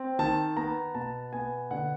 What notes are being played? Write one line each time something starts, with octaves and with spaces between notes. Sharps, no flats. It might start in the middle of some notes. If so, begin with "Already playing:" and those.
Already playing: C4
D#3 A5
B3 A#5
B2 A5
B3 G#5
D3 F#5